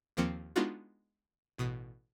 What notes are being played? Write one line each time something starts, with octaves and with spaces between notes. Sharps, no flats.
D#2 F3 A#3 C4 C#7
G#3 B3 D4 D#4 F4 F#4
A1 B2 D#6 B6